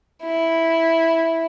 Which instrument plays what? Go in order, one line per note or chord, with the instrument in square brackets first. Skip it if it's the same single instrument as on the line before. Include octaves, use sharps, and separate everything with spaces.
[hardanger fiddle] E4